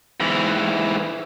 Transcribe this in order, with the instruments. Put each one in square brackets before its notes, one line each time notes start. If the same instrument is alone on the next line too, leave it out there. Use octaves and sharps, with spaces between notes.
[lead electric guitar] G#2 E3